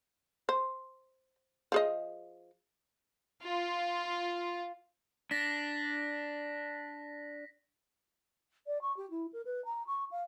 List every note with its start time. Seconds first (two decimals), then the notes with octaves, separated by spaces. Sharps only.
0.49 C5
1.72 F3 G#4 D#5
3.44 F4
5.31 D4 A#6 B6
8.67 D5
8.81 C#6
8.96 G4
9.10 E4
9.32 A#4
9.45 B4
9.65 A#5
9.87 C#6
10.11 F5